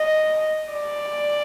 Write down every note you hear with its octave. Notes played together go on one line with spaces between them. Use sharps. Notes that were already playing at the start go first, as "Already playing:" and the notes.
Already playing: D#5
D5